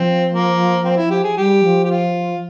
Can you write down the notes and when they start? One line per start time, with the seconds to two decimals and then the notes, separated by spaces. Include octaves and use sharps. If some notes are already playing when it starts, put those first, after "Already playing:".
Already playing: F3 C4
0.31 A#3
0.85 C4
0.97 E4
1.11 G4
1.24 G#4
1.37 G3 G4
1.64 F3
1.85 G4
1.91 F4